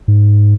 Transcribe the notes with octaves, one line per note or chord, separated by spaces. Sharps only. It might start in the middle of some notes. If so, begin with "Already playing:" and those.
G#2